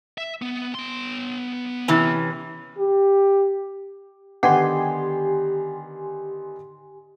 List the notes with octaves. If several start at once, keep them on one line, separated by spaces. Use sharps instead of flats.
E5
B3
B3 C6
C3 E3 C#4
G4
D3 D#3 B3 G4 F#5 G#5 C6